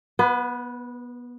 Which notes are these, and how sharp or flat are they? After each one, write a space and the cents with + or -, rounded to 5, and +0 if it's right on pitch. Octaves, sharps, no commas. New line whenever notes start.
B3 -20 B4 +30